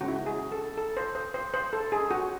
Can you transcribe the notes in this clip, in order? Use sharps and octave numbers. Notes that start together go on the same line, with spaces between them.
C#3 G#3 C#4 F#4
E4
F#4
G#4
A4
A4
C5
C5
C5
C5
A4
G#4
F#4